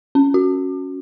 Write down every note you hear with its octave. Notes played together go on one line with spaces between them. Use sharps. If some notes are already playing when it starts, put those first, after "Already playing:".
C#4
F#4